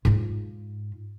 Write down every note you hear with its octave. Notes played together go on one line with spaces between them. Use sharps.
G#2 F4